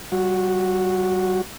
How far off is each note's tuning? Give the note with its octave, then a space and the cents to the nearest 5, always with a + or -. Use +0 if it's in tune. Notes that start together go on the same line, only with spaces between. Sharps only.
G3 -35 F#4 -10